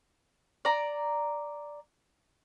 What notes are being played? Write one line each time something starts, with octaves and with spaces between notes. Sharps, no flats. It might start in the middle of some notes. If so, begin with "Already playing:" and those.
D5 A#5